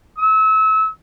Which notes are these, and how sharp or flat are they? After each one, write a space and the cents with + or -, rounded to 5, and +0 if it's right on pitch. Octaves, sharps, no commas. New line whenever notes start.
E6 -30